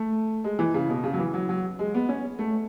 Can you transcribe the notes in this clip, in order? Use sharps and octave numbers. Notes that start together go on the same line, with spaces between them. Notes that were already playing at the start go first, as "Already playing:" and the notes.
Already playing: A3
G#3
E3
C#3
B2
C#3
F#3
E3
F#3
F#3
G#3
B3
C#4
A3